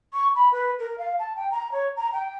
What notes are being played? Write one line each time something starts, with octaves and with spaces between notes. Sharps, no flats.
C#6
B5
B4
A#4
F5
A5
G5
A#5
C#5
A#5
G5